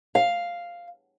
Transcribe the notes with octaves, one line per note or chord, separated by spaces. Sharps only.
F5